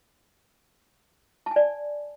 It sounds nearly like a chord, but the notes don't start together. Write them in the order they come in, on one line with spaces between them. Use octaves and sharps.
A5 G#5 D5